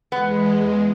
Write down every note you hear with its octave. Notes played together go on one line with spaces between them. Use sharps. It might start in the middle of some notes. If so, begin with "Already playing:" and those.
E2 G#3 B3